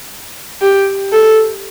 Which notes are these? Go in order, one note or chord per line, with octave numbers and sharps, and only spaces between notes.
G4
A4